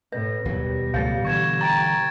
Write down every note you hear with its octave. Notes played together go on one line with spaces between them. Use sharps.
A2 B4 A#6
D#2 B2 F#3 G3
C#2 A2 F#3 F5 G6 A6
D3 E3 C#6 G#6 E7
G5 A#5 A6 D7